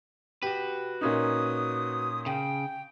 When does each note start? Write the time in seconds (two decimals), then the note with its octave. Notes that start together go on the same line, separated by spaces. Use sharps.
0.42 F#4 G4 B4
1.01 A#2 C#4 D#4 D#6
2.26 C#3 G5